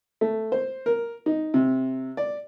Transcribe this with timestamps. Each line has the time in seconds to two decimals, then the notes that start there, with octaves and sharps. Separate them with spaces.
0.21 A3
0.52 C5
0.86 A#4
1.26 D#4
1.54 C3
2.17 D5